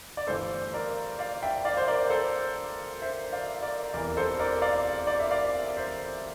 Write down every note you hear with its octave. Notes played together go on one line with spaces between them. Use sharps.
D5
G1 G2 E3 A3 A4 C5
A#4 D5
D5 F5
E5 G5
D5 F5
C5
A#4 D5
A4 C5
C5 E5
D5 F5
A#4 D5
F1 E2 E3 A#4 D5
A4 C5
A#4 D5
D5 F5
D5
E5
D5 F5
C5 E5